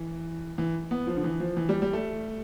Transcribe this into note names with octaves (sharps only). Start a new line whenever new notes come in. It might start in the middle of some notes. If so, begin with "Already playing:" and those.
Already playing: E3
E3
B3
F3
D3
E3
F3
E3
G3
G3
A3